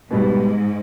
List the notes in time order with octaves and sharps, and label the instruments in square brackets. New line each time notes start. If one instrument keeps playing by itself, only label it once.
[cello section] G#2 [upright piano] B2 G3 B3